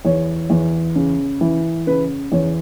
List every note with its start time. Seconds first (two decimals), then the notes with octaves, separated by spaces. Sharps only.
0.05 E2 C#5
0.50 E2
0.96 C#3
1.41 E3
1.87 C#3 B4
2.32 E2 C#5